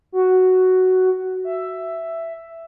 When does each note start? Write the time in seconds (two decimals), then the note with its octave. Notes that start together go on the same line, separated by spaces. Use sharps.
0.12 F#4
1.44 E5